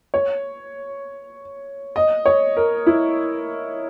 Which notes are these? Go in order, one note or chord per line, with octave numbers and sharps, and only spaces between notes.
C#5
D#5
C#5
A#4
E4